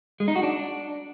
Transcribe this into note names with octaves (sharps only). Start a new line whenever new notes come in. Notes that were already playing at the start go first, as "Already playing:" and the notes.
G#3
D#4
F#4
D4